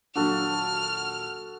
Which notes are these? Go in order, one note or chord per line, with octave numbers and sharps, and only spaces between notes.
D#2 A#2 F#3 D4 F#4 A4 F6